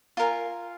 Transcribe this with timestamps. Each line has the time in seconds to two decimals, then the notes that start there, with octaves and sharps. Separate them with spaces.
0.17 F4 A#4 F5 G#5